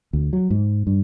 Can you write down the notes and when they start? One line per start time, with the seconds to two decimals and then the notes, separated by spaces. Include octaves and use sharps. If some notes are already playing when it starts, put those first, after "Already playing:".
0.13 D2
0.33 F#3
0.50 G#2
0.87 G2